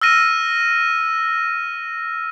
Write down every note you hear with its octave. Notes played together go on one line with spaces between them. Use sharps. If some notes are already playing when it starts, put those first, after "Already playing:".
E6 F6 A#6 D#7